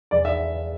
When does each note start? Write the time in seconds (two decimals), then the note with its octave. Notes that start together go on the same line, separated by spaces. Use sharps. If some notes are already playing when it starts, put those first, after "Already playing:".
0.11 E2 D5
0.25 E5